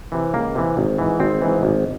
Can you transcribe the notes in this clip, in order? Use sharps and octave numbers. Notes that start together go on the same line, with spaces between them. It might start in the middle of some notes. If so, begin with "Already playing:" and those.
C3 E3
C#2 A#3
C3 E3
G#1
G#2 E3
G#1 C4
G#2 E3
G#1